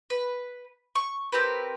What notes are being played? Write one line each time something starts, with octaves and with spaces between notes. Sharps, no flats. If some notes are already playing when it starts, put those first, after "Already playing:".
B4
C#6
C4 G4 A#4 B4